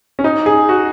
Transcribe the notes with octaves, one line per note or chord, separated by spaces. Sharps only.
C#4
D#4
G#4
F#4